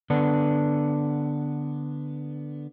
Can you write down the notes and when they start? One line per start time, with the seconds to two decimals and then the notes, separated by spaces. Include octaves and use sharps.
0.10 D3 B3 D4